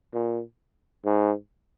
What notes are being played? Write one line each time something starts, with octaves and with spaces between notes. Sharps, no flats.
A#2
G#2